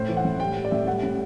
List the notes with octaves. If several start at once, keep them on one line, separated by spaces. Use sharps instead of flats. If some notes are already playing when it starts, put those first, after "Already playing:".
Already playing: A2 C5
E3
F#5
A2
G3 G5
G3
D5
A2 E5
G3 F#5
A2